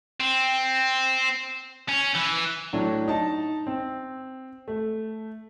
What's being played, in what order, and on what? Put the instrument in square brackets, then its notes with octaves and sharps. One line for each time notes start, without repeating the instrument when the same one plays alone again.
[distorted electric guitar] C4
C#4
E3
[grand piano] A2 F#3 D4
D#4 A5
C4
A3